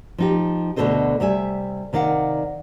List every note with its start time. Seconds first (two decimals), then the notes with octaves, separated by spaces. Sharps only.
0.18 F3 D#4 G4
0.76 D2 B2 D3 A4 C5 D#5
1.20 C3 G3 E5 G#5
1.93 C3 D#3 D5 F5 F#5